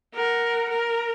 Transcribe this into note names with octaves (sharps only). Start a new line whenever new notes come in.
A#4 F#5
A#4